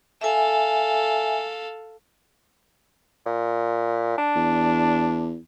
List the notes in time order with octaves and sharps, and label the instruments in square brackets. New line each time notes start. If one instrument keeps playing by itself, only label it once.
[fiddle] A4 F5 [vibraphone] E5 G#5
[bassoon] A#2
D4
[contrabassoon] E2